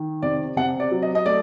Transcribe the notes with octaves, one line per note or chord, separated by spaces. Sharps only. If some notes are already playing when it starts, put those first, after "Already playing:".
Already playing: D#3
C3 D5
C3 F#5
D5
F#3
D#5
D#5
A3 D5